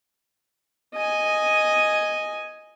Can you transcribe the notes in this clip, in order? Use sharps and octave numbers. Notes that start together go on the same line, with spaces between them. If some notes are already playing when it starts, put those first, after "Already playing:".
D#5 G#5